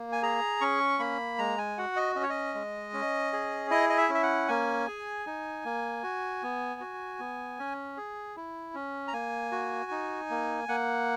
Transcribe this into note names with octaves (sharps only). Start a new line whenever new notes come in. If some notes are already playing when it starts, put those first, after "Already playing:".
Already playing: A#3
G#5
G#4 A#5
C#4 C#6
A#3 B5
G#3 A#5
G#5
F#4 F#5
D#5
C#4 D#5
C#5
D#5
G#3
C#4
G#4
E4 D#5
D#5
E5
C#4
E5
F#5
A#3 G#5
G#4
D#4
A#3
F#4
B3
F#4
B3
C#4
G#4
E4
C#4
A#5
A#3 G#5
F#4
D#4
A#3
A#3 F#5